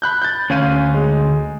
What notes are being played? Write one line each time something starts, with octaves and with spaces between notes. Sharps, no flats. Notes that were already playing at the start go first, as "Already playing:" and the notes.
B5 F#6 G6
G6 A6
D2 C#4 F5 D#7
G#3